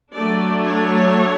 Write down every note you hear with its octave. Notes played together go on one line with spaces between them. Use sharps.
F#3 A3 D4 D5
C#5